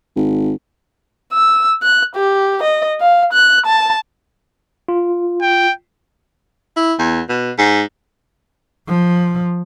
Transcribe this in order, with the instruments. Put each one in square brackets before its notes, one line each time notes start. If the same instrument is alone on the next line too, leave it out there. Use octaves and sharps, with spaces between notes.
[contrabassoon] G#1
[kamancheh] E6
F#6
G4
D#5
F5
F#6
A5
[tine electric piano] F4
[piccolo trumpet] G5
[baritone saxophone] E4
E2
B2
G#2
[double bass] F3